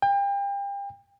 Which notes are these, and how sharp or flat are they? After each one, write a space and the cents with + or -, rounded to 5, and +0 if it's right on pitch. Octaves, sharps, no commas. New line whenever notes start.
G5 +35